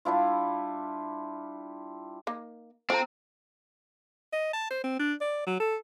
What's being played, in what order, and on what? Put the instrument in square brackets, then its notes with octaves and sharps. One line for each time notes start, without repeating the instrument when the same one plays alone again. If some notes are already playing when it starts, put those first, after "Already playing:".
[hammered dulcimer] G3 D4 E4 F4
[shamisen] A#3 D#4
[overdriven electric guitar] C4 [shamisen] F4 A4 [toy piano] C5 A#5
[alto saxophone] D#5
A5
C5
C4
D4
D5
F#3
A4